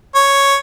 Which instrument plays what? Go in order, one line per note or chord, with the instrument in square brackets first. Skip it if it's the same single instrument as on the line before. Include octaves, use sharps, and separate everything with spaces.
[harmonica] C#5